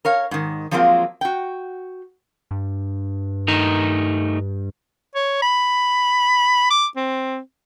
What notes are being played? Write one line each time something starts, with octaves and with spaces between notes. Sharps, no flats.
A#4 C#5 F5
G#2 D#3
F3 F#3 G#3 A#3 C4 F4
F#4 G5
G2
A3 D#4 A#4
C#5
B5
D6
C4